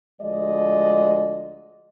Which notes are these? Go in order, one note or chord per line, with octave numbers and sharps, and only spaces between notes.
D2 F3 G#3 D5 D#5